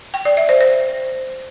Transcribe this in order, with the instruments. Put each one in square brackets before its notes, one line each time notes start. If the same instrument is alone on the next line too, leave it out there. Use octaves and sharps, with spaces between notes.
[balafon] G5
D5
E5
C5
C5